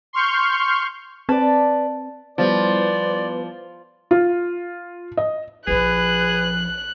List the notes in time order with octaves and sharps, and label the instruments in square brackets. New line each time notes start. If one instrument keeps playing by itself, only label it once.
[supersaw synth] C6 C#6 F6 G6
[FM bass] C4 [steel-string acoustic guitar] B4 D5 [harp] A5
[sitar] F3 [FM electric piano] G3 B3 E4 [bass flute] B4 [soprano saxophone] D5
[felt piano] F4
D#5
[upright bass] A#1 F3 [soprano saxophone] G#4 [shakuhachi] B4 [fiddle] F#6